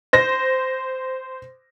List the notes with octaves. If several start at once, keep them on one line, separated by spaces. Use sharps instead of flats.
C5 A#6